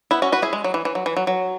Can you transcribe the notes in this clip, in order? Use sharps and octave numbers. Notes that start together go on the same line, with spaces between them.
B3 E4
C#4 F#4
F#4 B4
E4 G#4
G#3
F#3
E3
E3
F#3
E3
F#3
F#3